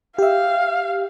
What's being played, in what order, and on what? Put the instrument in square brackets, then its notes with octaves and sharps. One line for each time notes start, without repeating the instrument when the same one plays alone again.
[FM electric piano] G4 E5 [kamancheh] F5